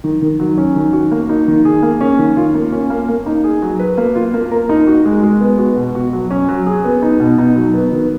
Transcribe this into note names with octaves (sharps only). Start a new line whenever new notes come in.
D#3
D#3
F#3
C#4
D#3
F#4
A#3
D#4
D#3
G#4
A#3
C#4
D#3
F4
A#3
C#4
A#3
A#3
D#4
G#4
F#3
B4
A#3
F4
A#3
A#4
D#4
F#4
G#3
G#3
B3
F#4
B2
F#4
F#3
C#4
F#3
G#4
B3
D#4
B2
D#4
F#3
B3
D#3